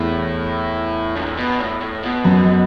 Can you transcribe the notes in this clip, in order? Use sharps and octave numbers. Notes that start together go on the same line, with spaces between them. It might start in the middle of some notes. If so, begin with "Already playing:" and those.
Already playing: E2 A2
F#2
A2
B2
A2
A2
B2
F#2